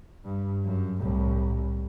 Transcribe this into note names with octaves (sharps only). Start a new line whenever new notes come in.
G2
F#2
C2 A2